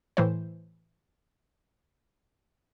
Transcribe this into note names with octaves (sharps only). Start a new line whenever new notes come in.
A2 E3 C5